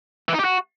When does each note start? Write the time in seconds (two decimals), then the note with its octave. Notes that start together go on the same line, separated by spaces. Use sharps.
0.29 E3
0.34 D#4
0.39 G4
0.44 F#4